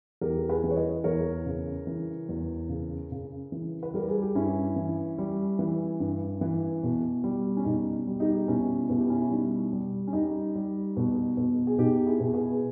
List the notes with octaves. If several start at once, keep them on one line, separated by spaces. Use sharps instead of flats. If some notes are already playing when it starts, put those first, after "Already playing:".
E2 G4 A#4
G#4 B4
E3
C#5
B4 D#5
E2 A#4 C#5
C#3
E3
E2
C#3
C#3
E3
B4
G3 A#4
G#4
G4
G2 C#4 E4
E3
G3
E3
G2
E3
B2
G3
C#4
B2 D#4
G3
D#4 G4
B2 C#4 E4
B2 E4
G4
C#4 E4
E4
G3 D#4
G3
C#4
G3 D#4
G3
B2
B2
G#4
B2 D#4 G4
E4 G#4
B2
G#4 B4